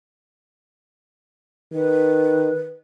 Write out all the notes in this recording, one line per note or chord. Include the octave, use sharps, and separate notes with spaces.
D#3 B4